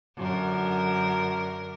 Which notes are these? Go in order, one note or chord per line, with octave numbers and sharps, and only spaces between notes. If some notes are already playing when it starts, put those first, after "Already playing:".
F#2 D3 A#4